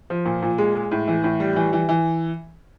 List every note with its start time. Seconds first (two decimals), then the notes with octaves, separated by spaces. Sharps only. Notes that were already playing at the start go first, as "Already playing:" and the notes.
0.10 F3
0.26 A#2
0.43 A#2
0.58 G#3
0.75 G#3
0.91 A2
1.08 E3
1.24 A2
1.40 G3
1.56 E3
1.73 E3
1.89 E3